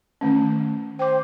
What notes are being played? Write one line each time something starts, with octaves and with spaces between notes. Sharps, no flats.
D#3 A3 C#4
C5 G5 D6